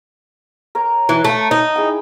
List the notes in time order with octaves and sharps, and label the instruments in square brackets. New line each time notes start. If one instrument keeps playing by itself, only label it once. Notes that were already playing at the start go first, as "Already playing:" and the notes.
[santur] A#4 C#5 G5
[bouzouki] E3
[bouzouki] A3 [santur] E5 F5
[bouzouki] D#4
[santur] E4 G#4 G5